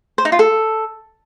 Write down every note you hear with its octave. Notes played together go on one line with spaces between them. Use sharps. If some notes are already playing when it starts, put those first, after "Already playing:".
C5
D#4
F4
A4